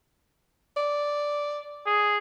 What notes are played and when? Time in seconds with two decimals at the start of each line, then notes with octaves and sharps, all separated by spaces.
0.77 D5
1.86 G#4